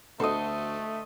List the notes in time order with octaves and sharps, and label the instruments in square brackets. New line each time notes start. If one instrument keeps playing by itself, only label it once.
[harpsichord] D2 [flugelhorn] A3 [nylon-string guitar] F#4 A4 [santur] D#5 C6